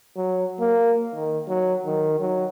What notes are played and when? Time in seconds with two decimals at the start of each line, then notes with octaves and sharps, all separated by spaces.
0.17 F#3
0.60 A#3
1.14 D#3
1.48 F#3
1.86 D#3
2.20 F#3